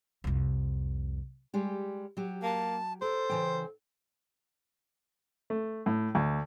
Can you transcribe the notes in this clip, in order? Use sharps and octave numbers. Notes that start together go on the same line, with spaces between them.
C2 F2
G3 G#3 G4
F#3 G4
A#3 A5
A4 A#4 C5
C#3 E3 G5
A3
A2
D2